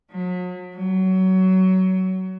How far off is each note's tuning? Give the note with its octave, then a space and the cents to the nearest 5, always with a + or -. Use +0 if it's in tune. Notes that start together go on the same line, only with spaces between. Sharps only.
F#3 -40
F#3 +20